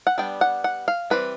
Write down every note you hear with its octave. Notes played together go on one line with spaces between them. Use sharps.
F#5
G3 B3 D4 G5
F#5
F#5
F5
E3 G3 C4 B4